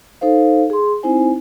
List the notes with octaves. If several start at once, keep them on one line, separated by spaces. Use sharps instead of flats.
D#4 A4 C5 F5
G#4 C6
C4 D#4 E4 C5 G#5